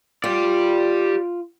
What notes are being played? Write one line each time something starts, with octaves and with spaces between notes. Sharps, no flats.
F4 G4 D5